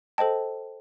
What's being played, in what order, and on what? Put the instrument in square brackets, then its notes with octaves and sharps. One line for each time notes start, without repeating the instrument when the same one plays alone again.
[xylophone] A4 C5 D#5 G5 A5